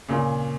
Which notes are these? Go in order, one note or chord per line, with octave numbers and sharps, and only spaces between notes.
A#2 C#3